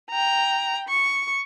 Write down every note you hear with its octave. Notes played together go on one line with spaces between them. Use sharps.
G5 A#5
C#6